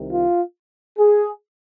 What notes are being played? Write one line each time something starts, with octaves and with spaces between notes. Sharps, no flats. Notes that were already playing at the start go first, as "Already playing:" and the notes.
Already playing: C2 C3 D#3
F4
G#4